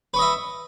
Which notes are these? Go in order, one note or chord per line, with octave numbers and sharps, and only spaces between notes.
B4 D#5 E5 C#6